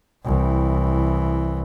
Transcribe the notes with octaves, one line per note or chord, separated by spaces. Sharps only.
C2 E3